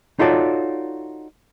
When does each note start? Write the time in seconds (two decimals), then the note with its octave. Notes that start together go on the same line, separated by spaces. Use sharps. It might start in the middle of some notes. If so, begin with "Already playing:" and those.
0.19 D#4 F4 F#4 A4 C#5 D5